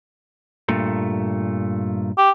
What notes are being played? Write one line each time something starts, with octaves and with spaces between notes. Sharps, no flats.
G2 A#2 A3
G4